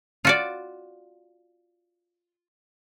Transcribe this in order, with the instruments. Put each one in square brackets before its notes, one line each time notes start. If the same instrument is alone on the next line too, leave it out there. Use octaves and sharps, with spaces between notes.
[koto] F4 F#4 D5